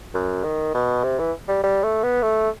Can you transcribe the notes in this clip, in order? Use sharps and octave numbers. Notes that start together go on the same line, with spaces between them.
F#2
D#3
B2
C3
E3
G3
G3
A3
B3
A3